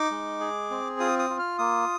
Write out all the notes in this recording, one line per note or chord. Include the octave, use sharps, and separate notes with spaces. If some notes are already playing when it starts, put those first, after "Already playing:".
Already playing: D#4 D6
G#3
G#4
C4
F4 D#6
D#6
F4
F6
A#3 D#6